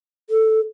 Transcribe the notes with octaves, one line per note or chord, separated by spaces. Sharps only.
A4